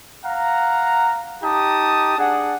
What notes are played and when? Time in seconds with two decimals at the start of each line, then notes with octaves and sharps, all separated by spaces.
0.25 F5 F#5 A#5
1.43 D#4 G4 A5 A#5 D#6
2.18 D4 G#4 F#5